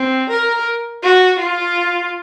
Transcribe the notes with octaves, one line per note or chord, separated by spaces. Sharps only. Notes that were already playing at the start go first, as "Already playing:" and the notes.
Already playing: C4
A#4
F#4
F4